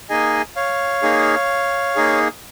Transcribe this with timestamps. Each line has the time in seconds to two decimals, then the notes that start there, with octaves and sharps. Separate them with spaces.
0.10 A#3 D#4 G#4 D#5 G#5
0.56 C#5 F5
1.02 A#3 D#4 G#4
1.96 A#3 D#4 G#4